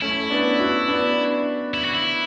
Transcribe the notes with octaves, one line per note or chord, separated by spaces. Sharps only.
A3 C#4 E4
B3 D4
D4 F#4
B3 D4
E4
F#4
E4